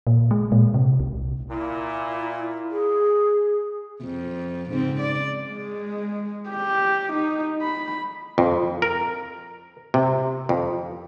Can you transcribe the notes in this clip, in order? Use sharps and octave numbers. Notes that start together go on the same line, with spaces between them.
A#2
G#3
A#2
C3
C2
A#2 E4
G#4
F2
G#2 C#3 C4
D5
G#3
G4
D#4
B5
F2
A#4
C3
F2